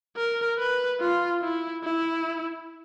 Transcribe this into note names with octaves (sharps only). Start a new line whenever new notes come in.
A#4
B4
F4
E4
E4